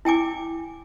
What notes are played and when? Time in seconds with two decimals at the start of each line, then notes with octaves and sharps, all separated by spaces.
0.05 E4 G5 G#5 D6